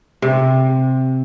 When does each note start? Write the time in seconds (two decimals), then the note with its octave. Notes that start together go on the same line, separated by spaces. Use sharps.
0.22 C3